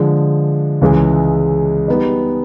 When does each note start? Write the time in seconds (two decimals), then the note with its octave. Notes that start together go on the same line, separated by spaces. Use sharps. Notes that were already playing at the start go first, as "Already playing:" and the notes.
Already playing: D3 F3 G#3
0.81 C#2 C#3 E3 G#3
1.88 G3 B3 D#4